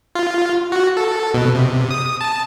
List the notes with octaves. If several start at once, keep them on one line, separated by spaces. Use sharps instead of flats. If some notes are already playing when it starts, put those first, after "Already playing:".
F4
F#4
A4
B2
C3
D#6
A5